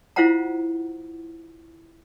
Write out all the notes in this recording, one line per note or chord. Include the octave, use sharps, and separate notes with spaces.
E4 F4 C5 F5 F#5 A#5